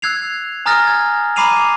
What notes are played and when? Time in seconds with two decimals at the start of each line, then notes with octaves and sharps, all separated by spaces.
0.02 E6 F#6 G#6 C7 F7
0.66 G#5 A#5 D#6 F6 A6 A#6
0.87 G#6
1.36 A#5 B5 D6 C7 D#7 F7